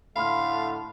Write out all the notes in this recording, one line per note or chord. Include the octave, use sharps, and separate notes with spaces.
A2 D3 A3 F5 B5 C6 F6